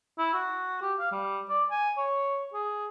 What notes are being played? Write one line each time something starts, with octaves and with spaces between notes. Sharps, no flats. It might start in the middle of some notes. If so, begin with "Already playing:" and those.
E4
F#4
G4
F5
G3
D5
G#5
C#5
G#4